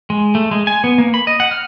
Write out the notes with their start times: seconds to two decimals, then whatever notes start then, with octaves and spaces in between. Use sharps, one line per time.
0.10 G#3
0.35 A3
0.51 G#3
0.67 G#5
0.84 B3
0.98 A#3
1.14 B5
1.27 D#5
1.40 F#5
1.51 F6